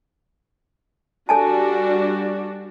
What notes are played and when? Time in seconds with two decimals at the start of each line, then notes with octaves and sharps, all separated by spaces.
1.29 G3 D4 F#4 A4 G#5 A5